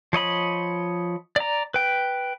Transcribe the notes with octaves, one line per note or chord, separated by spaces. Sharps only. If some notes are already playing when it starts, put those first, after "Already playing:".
F3 C#5 D#5 B5
D5 A#5
B4 G5